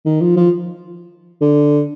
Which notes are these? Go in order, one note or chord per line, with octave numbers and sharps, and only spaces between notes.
D#3
F3
F3
D3